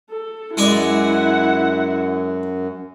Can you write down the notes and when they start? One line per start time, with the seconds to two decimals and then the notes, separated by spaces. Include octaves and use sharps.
0.10 A4
0.57 F#2 G#3 E4 G#4 D5 F#5